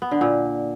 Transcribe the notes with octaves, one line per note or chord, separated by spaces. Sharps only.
B3
D3
A#2